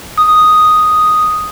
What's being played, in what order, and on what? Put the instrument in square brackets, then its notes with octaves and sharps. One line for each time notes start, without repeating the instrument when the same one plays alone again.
[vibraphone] D#6